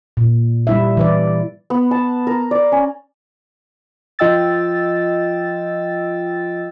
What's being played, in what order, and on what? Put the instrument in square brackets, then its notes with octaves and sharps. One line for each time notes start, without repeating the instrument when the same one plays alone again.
[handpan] A#2
G3 E4 E5
E3 B4 D5
[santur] B3
A5
A#4
D5
C#4
[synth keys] F3 F4 D#5 G5 E6 A6